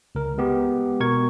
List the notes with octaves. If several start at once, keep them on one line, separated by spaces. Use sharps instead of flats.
C#2 A#4
G#3 B3 G4
B2 A#4 C#6 G#6